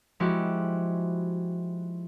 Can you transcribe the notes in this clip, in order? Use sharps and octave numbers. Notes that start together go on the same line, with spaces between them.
F3 G#3 E4 F#4 G4